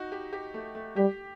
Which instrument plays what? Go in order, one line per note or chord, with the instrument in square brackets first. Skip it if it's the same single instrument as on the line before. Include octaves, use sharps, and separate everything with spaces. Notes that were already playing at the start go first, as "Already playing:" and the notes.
Already playing: [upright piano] D#4 F#4
G4
G4
A3
A3
[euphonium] G3 [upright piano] G4